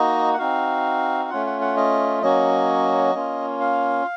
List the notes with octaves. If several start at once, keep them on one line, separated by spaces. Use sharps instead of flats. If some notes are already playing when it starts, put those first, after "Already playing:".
Already playing: A#3 D#4 F#4 D#5
F#5
C4 D#4 F#4 F5
F5
A3 C#4 F4 F#5
F#5
F#5
D#5
F#3 A#3 C#4 F#4 D#5
A#3 C#4 F4
F5